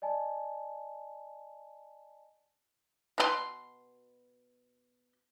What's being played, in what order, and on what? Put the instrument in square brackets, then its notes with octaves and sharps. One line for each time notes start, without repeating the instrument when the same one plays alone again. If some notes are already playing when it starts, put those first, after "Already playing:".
[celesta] D5 D#5 G#5 A5
[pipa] B2 D#4 C6